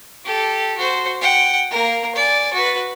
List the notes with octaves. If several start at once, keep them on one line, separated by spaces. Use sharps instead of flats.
G4 A4
F#4 C5
F#5 G5
A#3 A#4
D5 G#5
F#4 B4